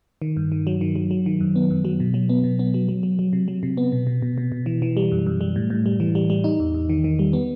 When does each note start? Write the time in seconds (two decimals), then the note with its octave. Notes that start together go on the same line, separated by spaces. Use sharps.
0.22 D#3
0.37 G2
0.52 D#3
0.67 F#3
0.81 D#3
0.96 F#3
1.11 F#3
1.26 D#3
1.40 F#2
1.56 B3
1.70 F#2
1.85 F#3
2.00 B2
2.14 F#3
2.29 B3
2.44 B2
2.59 B3
2.74 F#3
2.89 F#3
3.03 F#3
3.19 F#3
3.33 C3
3.48 F#3
3.63 C3
3.77 B3
3.92 B2
4.07 B2
4.22 B2
4.38 B2
4.52 B2
4.66 E3
4.82 E3
4.97 G3
5.12 F#2
5.27 F#2
5.41 G3
5.56 A2
5.70 A2
5.86 G3
6.00 E3
6.15 G3
6.30 G3
6.44 D#4
6.60 E2
6.74 E2
6.89 D#3
7.04 D#3
7.19 G3
7.33 B3